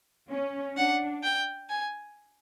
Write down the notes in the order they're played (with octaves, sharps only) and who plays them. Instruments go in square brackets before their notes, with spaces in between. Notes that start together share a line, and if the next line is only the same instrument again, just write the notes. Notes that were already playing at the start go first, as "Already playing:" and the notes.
[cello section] C#4
[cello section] D4 [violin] F#5
[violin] G5
G#5